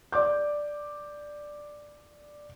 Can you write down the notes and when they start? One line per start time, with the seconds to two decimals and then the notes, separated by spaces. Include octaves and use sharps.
0.12 D5 D6 G6